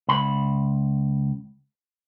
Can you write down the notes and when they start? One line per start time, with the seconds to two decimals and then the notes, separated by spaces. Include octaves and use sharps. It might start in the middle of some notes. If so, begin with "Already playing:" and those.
0.09 C#2 B5